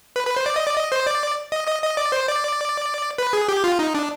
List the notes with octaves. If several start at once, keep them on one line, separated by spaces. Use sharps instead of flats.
B4
B4
C5
D5
D#5
D5
D#5
C5
D5
D#5
D#5
D#5
D5
C5
D5
B4
G#4
G4
F4
D#4
D4